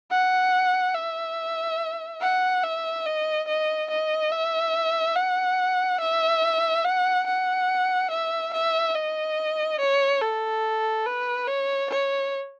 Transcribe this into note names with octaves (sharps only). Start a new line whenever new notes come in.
F#5
E5
F#5
E5
D#5
D#5
D#5
E5
F#5
E5
F#5
F#5
E5
E5
D#5
C#5
A4
B4
C#5
C#5